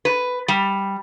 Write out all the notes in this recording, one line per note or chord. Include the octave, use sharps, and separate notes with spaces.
B4
G3